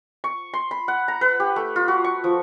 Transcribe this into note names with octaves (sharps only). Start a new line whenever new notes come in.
C#6
C6
B5
F#5
A#5
B4
G4
A3
F4
F#4
C#6
F3